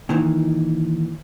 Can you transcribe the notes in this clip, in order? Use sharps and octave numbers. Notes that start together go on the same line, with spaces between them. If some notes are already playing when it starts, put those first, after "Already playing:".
A#2 D#3 E3